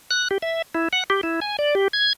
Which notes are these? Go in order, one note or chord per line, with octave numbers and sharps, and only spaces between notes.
F#6
G4
E5
E4
F#5
G4
E4
G#5
D5
G4
G#6